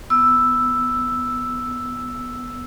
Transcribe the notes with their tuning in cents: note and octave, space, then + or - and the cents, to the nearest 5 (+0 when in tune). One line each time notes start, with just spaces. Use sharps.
B3 +0 E6 +0